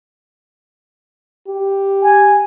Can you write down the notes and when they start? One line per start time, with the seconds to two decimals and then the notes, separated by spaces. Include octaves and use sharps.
1.48 G4
2.03 G#5